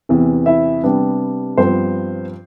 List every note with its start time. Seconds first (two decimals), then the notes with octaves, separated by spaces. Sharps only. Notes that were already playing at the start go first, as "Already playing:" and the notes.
0.09 E2 C3 E3
0.46 E4 E5
0.83 C3 G3 B3 D4
1.58 G2 F3 B3 C4 C5